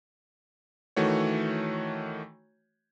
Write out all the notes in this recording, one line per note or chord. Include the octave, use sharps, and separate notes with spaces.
D#3 E3 A3 F#4 C#5